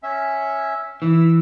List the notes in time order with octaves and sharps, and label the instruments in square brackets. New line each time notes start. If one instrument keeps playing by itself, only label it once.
[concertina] C#4 E5
[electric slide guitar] E3 [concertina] E6